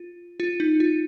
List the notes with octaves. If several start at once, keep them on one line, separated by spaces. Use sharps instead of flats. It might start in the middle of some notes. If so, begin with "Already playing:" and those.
Already playing: F4
F4
D#4
F4